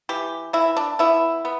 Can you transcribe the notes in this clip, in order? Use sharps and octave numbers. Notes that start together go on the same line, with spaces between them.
E3 G4
E3 E4
D4
B3 E4
B3